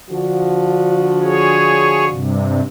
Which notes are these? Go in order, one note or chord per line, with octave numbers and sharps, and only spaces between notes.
D3 F3 F#4
G#4 C#5
G2 C3